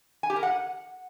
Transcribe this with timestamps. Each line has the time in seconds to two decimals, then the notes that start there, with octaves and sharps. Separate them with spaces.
0.23 G#5
0.30 G4
0.36 A#4
0.43 F#5